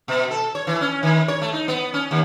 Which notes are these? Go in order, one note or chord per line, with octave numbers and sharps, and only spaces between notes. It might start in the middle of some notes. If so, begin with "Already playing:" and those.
B2
A4
C#5
E3
C#4
D#3
C#5
A3
D#4
B3
C#4
D#2